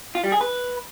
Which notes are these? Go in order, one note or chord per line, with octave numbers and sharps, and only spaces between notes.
F4
G3
G#4
B4